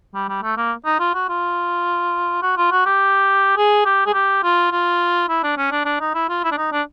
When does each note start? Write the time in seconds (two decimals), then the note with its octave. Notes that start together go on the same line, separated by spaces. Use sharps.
0.14 G3
0.29 G3
0.43 A3
0.57 A#3
0.85 D#4
1.00 F4
1.14 F#4
1.29 F4
2.43 F#4
2.57 F4
2.71 F#4
2.86 G4
3.57 G#4
3.85 G4
4.06 G#4
4.14 G4
4.43 F4
4.71 F4
5.29 E4
5.43 D4
5.57 C#4
5.72 D4
5.86 D4
6.01 D#4
6.15 E4
6.29 F4
6.44 E4
6.52 D4
6.57 D#4
6.72 D4